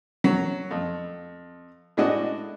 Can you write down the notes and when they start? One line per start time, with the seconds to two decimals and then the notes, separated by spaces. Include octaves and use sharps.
0.24 F#3
0.71 F2
1.97 A2 G#3 D4 F#4 D#5